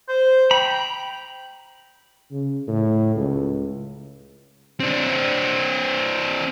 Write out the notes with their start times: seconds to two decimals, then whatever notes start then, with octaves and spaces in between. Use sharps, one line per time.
0.09 C5
0.51 G5 A#5 B5
2.31 C#3
2.68 A2
3.16 C#2
4.80 C4 D4